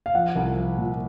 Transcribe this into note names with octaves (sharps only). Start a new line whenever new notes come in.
F5
F3 F#5
C2
F3
A#2